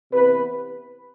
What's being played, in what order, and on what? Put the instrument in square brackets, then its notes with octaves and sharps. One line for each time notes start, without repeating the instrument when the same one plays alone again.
[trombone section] C3 E3 B3 B4